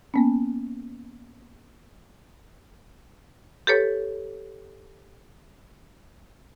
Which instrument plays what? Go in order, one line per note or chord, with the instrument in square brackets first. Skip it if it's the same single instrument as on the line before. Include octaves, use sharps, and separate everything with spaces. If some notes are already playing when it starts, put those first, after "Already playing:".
[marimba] A#3 B3 C#4
G4 A4 B4 C#5